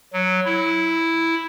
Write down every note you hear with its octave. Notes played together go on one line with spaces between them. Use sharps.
F#3
E4